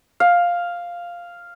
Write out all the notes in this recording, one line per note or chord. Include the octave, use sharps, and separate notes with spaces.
F5